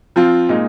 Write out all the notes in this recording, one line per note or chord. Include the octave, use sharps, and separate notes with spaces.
F3 C4 F4
A#2 G#3 D#4